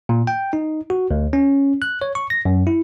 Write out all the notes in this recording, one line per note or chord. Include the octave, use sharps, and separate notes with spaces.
A#2
G5
D#4
F#4
D2
C#4
F#6
C#5
C#6
A#6
F#2
E4